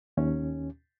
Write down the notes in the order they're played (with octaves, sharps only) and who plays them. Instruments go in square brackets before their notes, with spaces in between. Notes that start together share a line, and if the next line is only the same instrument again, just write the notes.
[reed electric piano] D#2 C#4